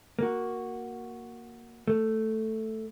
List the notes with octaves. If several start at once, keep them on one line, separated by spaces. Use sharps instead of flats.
A#3 F#4
A3